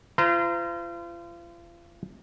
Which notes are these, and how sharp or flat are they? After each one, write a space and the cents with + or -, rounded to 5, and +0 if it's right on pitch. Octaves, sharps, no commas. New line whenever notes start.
F4 -35 C5 -40 A#5 +0